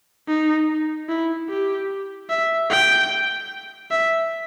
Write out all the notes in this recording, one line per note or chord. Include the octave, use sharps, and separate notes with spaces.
D#4
E4
G4
E5
G5
E5